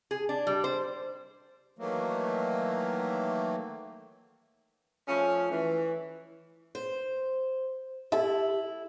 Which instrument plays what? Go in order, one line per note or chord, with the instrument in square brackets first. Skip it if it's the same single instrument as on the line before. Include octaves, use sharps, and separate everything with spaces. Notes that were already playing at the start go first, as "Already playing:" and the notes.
[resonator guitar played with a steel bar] G#4
D4
G3
C5
[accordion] D#3 E3 F#3 A3 A#3
[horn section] F3 A3 C#4
E3
[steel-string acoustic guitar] C5
[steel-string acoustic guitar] E4 [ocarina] G4 [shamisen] A4 E5